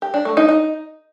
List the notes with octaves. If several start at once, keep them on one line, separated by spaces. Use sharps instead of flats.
G4
D4
A3
D#4
D#4